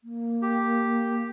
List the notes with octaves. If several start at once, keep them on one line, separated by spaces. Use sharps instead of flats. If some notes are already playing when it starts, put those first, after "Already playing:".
A#3
G4